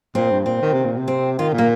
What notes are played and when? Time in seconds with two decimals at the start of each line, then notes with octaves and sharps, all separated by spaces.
0.15 A#2 C4
0.30 G2
0.46 A#2 C4
0.62 D#3
0.73 C3
0.85 A#2
0.97 C3
1.08 C4
1.39 D#3 F4
1.53 A#2
1.58 A#3